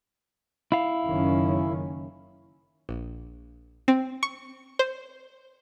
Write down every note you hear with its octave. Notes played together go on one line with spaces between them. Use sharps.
E4 F5
F#1 D#3 C#4
A#1
C4
C#6
C5